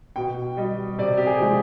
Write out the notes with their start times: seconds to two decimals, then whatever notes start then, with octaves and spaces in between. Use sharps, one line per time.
0.16 B2 G5
0.57 G3 D#5
0.98 C3 D5
1.17 G4
1.26 G#4
1.40 F3 G#3